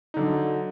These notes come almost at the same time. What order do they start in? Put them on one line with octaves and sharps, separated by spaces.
D#4 D3 F#3